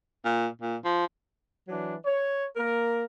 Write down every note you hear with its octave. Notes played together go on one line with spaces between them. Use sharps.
A#2
A#2
F3
E3 F#3 D4
C#5
A#3 A#4